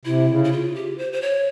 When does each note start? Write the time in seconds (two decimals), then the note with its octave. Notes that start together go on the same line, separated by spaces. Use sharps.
0.05 C3 E4
0.29 C#3
0.44 E4
0.52 F4
0.75 G4
0.98 C5
1.13 C5
1.22 C#5